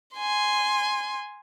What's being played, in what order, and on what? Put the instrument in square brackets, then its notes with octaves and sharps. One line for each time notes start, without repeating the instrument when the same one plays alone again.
[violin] G#5 C6